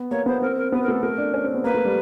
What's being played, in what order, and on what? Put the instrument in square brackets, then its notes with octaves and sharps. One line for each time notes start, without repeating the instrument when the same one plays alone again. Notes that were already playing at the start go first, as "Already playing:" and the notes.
Already playing: [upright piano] B3
[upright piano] A#3 [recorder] C#5
[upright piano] B3 [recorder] C5
[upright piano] C4 [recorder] A#4
[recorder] A#4
[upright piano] B3 [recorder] B4
[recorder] A#4
[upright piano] A3 [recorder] A4
[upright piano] A3 [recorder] A#4
[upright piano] D4
C#4
C4
B3
[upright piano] A#3 [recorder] B4
[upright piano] A3
G3